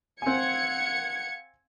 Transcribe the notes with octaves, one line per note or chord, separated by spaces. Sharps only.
C4 F5 F#5 G#5 G#6 C#7